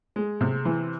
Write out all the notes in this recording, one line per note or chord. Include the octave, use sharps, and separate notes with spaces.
G#3
C3
E3